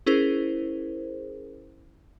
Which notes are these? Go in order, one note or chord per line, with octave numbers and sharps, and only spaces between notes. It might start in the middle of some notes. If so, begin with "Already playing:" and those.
C#4 E4 G#4 A#4 C5